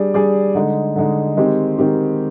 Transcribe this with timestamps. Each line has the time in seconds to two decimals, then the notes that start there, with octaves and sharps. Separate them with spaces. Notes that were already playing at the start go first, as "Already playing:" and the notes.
Already playing: G3 D4 G#4 D5
0.14 G3 D4 G#4 D5
0.55 D3 G#3 D#4
0.96 D3 G#3 D#4
1.37 D#3 G#3 C4 G4
1.78 D#3 G#3 C4 G4